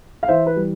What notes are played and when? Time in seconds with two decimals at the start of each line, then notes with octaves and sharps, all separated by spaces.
0.23 F5
0.28 E3 C5 E5
0.46 B4
0.56 G3